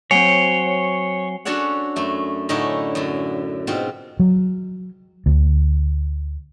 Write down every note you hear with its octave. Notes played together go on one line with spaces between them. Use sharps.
F#3 C4 C#5 G#5 C7 G7
C#4 D4 F#4 A4 C#5 F#5
F#2 A3
A2 D3 C#4 D#4 E4
F#2 D3
G#2 B2 C4 F4
F#3
D2